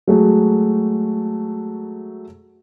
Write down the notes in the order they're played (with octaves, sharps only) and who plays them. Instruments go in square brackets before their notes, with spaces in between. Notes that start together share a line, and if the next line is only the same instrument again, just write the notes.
[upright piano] F#3 G#3 A3 F#4 G#4